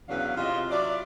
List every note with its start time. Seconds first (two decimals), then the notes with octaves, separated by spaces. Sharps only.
0.09 E2 C#3 F#3 D4 B4 F5
0.37 C3 F4 D#5
0.71 F#3 E4 F4 D5